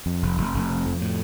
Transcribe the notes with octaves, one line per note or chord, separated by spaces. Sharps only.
F2
F1
F1
F1
C3
F2
A2